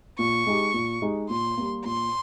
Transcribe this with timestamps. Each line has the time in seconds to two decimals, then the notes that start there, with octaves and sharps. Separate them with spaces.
0.19 A#2 C#6
0.46 G#3 D#4 G4
0.74 A#2
1.02 G#3 D#4 G4
1.29 A#2 C6
1.57 G3 A#3
1.85 A#2 C6